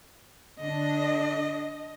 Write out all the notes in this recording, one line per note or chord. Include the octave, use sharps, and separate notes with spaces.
D3 D4 D#5